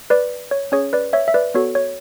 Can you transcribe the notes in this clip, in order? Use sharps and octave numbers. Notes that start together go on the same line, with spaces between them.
B4 D5
C#5
C#4 G#4 C#5
B4 D5
C#5 E5
E5
B4 D5
B3 F#4 A4 C#5
C#5